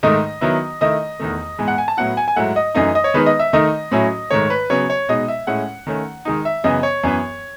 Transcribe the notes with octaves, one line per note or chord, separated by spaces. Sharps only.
G#2 D#3 A3 D#4 D#5
D#3 F#3 B3 E4
D#3 A3 E4 D#5
E2 D#3 A3
G#2 E3 G#3 B3
F#5
G#5
A5
A2 F#3 B3 E4 F#5
G#5
G#5
G#2 F#3 A3 E4 F#5
D#5
F#2 E3 A3 D#4 D#5
D#5
C#5
D#3 G#3 B3 D#4 B4
D#5
E5
D#3 A3 D#4 D#5
A2 F#3 C#4 E4
G#2 D#3 A3 C#5
B4
C#3 F#3 B3 C#5
C#5
B2 G#3 D#4 D#5
E5
A2 G#3 C#4 E4 F#5
D#3 A3 C#4
D#3 G#3 D#4
E5
F#2 C#3 E3 B3 D#5
C#5
F#2 E3 B3